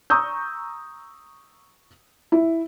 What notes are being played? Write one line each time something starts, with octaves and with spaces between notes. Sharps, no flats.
A#5 C#6 D#6 E6 G6
E4